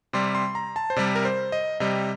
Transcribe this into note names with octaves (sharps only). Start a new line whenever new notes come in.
C3 G3 C6
C6
A#5
A5
C5
C3 G3 D5
A#4
C5
D#5
C3 G3 D#5